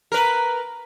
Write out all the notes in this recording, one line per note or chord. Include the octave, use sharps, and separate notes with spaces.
A#4 B4